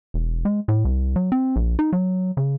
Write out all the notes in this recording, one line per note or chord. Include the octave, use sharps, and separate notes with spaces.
E1
G#3
A2
C2
F#3
C4
A#1
D#4
F#3
C#3